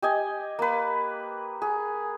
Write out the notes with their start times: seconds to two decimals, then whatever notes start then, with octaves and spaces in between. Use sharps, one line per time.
0.02 G4 D#5 G#5
0.59 A#3 B4
1.62 G#4